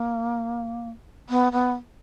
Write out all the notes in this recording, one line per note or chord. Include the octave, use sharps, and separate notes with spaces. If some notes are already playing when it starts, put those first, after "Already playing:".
Already playing: A#3
B3
B3